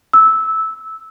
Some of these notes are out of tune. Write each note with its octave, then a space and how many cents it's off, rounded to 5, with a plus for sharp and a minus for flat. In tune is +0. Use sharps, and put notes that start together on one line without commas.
E6 -15